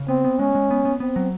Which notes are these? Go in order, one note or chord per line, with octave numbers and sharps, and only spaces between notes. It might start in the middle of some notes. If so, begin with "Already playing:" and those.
Already playing: C#3
B3 C4
B3
G#3 C#4
G#3
B3
B3
B3 C4
F#3